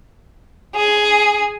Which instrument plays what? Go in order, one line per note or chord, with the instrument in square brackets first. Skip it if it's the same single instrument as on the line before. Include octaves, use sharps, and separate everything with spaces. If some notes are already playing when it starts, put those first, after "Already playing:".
[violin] G#4